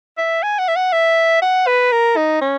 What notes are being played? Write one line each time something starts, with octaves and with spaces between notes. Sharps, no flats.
E5
G#5
F#5
E5
F#5
E5
F#5
B4
A#4
D#4
C#4